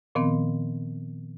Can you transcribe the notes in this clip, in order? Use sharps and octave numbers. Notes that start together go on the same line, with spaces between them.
A#2 D#3 F3 B3 C4